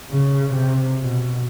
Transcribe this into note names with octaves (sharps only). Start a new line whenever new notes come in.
C#3
C3
B2